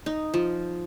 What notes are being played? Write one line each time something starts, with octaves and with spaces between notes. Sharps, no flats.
D#4
F3